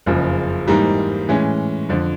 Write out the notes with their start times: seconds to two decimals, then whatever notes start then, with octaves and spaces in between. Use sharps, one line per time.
0.06 F#1 F2 C#3 F3
0.67 G#2 E3 G3 A#3 D#4
1.29 A2 E3 G#3 C#4
1.89 F2 D3 F3